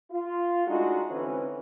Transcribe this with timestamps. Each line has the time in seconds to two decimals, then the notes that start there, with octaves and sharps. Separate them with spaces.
0.11 F4
0.67 G#3 A3 D4 D#4 F#4
1.09 D3 E3 C4 C#4 D#4 B4